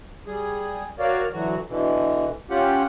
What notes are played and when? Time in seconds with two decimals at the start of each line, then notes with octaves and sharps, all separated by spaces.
0.27 G3 G#4
0.99 F#4 A#4 C#5 D5 F5
1.33 D3 E3 F#3 F#4
1.68 B2 D3 E3
2.50 C#4 F4 G4 F#5